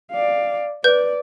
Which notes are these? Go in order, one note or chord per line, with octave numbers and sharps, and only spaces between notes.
D5 F5
B4 D5 G6